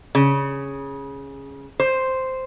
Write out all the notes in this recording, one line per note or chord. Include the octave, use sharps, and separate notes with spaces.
C#3
C5